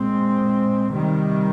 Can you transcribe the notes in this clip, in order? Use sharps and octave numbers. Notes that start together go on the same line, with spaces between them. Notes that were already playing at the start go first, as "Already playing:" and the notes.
Already playing: A#2 G#3 C4
C3 D#3 G3